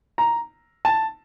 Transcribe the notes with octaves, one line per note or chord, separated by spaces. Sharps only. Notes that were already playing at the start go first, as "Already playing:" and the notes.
A#5
A5